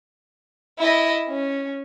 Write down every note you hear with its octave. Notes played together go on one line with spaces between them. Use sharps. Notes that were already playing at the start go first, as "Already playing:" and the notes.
E4 D#5
C#4